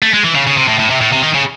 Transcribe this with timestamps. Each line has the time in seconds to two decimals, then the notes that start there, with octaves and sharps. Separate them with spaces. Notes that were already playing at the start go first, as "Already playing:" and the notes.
0.02 A3
0.14 G#3
0.24 E3
0.35 C#3
0.47 C#3
0.57 C3
0.68 A2
0.79 A2
0.90 C3
1.01 A2
1.12 C3
1.23 D#3
1.35 C#3